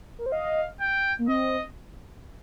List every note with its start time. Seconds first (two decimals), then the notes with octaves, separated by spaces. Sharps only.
0.19 A#4
0.26 C5
0.32 D#5 F5
0.80 G5
1.19 A#3
1.28 C4 D#5